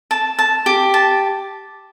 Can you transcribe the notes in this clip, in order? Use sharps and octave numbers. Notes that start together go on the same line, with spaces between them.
A5
A5
G4
A5